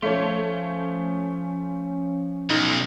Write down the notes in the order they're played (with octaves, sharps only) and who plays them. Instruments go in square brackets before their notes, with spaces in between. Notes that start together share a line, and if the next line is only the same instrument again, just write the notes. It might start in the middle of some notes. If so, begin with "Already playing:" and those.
[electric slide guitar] F3 F4 [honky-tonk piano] A3 C#5 [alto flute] C#4
[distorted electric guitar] B1 [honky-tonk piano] D#4